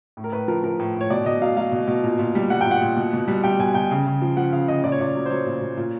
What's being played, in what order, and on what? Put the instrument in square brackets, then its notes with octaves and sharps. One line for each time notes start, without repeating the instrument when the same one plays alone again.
[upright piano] A2
A#4
A2 B4
F3 A#4
F3 A#4
A2
A2
C#5
B2 D5
B2 D#5
F#3 F5
F#3 F5
B2
B2
A#2
A#2
G3
G3 F#5
A#2 G5
F#5
A#2
B2
B2
G3
G3 G5
B2 G#5
B2 G5
C#3
C#3
F3
F3 F#5
C#3 F5
C#3 D#5
A#2 D5
C#5
A#2 D5
F#3
C5
F#3 C#5
A#2
A#2
A#2